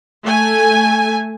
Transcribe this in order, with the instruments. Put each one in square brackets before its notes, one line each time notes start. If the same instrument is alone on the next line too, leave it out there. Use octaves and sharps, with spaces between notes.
[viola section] A3 G#5